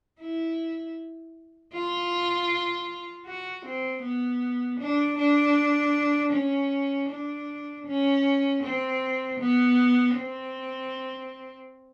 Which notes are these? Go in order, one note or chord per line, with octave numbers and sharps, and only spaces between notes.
E4
F4
F#4
C4
B3
D4
D4
C#4
D4
C#4
C4
B3
C4